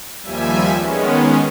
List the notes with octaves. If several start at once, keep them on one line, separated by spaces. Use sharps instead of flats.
D#2 F3 G3 E5 G#5
D#3 G#3 B3 C#4